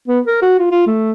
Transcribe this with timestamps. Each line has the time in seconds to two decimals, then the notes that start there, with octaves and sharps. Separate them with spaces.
0.08 B3
0.27 A#4
0.42 F#4
0.59 F4
0.71 F4
0.87 A3